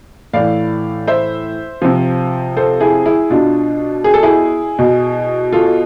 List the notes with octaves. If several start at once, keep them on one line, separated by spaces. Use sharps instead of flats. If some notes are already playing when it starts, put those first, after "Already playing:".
A2 E3 D5 F5
C5 E5
C3 F3
A4 C5
E4 G#4
E4 G#4
B2 D4 F4
G#4
A4
E4 G#4
B2
F4 A4